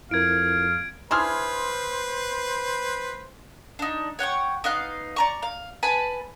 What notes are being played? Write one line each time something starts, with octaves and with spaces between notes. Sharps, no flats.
F2 E4 A#4 F5 G#6 D7
D4 E4 G#4 B4 C5 C6 F6 G#6
D4 D#4
C#5 F#5 G5 C#6
B3 D#4 F5 F#6
D5 A#5 C#6
F5
B4 G#5 A5 B5